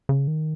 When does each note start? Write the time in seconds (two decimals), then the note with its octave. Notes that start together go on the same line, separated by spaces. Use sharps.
0.09 C#3
0.27 D#3